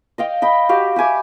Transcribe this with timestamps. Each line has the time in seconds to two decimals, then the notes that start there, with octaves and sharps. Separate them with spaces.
0.18 D#5 F5 G5
0.42 D#5 G5 B5
0.69 F#4 G4 F5
0.96 G4 E5 G#5 D6